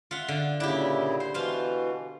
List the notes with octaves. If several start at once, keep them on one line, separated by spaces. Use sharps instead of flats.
F4 E5 F#5
D3
A#2 C#3 D4 E4 G4
C5
B2 E3 F4 C5 F5